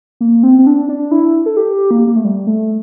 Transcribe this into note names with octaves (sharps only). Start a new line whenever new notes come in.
A#3
C4
C4
D4
D4
E4
A4
G4
A#3
A#3
A3
G3
A3